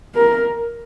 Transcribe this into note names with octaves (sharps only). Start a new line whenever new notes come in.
A#4